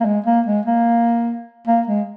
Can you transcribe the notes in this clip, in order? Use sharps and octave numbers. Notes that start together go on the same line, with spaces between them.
A#3
G#3
A#3
G#3
A#3
A#3
G#3